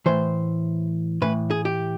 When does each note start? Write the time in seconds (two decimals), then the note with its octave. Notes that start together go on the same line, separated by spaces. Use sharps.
0.06 A2 E3 C5
1.22 A2 E3 B4
1.51 G#4
1.65 G4